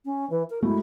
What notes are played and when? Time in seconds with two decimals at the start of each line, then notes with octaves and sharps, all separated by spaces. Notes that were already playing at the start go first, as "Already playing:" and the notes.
0.05 C#4
0.30 E3
0.50 A#4
0.62 F#3 G#3 A3 E4